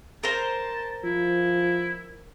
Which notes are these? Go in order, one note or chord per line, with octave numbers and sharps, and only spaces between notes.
A#4 C5 A5
F3 E4